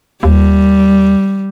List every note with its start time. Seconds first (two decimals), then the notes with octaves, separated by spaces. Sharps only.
0.23 D#2 G3